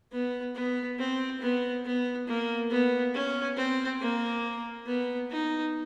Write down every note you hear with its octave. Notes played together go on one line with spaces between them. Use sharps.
B3
B3
C4
B3
B3
A#3
B3
C#4
C4
A#3
B3
D#4